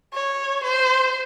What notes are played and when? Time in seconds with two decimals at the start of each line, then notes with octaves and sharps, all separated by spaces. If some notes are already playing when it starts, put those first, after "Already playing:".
0.14 C#5
0.64 C5